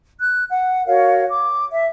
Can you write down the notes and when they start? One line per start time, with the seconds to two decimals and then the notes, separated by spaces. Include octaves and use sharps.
0.20 F#6
0.49 F#5
0.86 F#4 A#4 C#5 F5
1.28 D6
1.71 E5